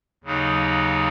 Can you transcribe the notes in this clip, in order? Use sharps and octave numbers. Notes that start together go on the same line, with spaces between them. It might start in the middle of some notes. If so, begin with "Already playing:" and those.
D#2 C#3 F#3 D#4